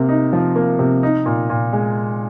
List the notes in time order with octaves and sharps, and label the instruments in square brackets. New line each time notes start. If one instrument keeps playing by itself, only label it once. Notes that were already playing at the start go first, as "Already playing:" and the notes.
Already playing: [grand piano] C3 A#3
D#4
F3
A#3
C3
D#4
A#2
A#2
G#3